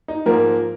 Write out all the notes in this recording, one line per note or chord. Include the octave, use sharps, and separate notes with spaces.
D#4
G#2 F3 A#3 A#4